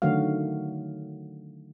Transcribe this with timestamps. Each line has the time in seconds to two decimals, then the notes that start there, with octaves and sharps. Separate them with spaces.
0.02 D3 D#3 F#3 A3 F#4 F5